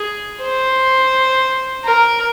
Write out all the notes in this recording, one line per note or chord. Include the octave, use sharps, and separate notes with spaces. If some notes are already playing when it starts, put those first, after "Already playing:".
Already playing: G#4
C5
A#4